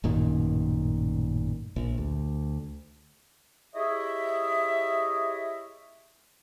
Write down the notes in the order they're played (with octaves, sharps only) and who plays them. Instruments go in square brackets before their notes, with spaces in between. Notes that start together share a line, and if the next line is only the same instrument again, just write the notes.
[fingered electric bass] A1 F#2 A#2 D#3
A#1
D2
[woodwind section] E4 G4 G#4 C#5 D#5 E5